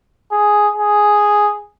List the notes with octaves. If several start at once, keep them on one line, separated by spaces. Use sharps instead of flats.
G#4
G#4